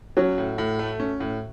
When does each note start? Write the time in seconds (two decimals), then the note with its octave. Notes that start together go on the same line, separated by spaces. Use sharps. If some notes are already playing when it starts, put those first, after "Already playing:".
0.17 F#3 C#4
0.38 A2
0.58 A2
0.79 A3
1.00 C#4
1.20 A2